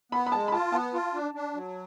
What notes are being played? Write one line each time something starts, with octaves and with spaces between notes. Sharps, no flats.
B3 B5
B5
G#3 A5
B5
F4 A5
B3 A5
F4
D4
D4
F#3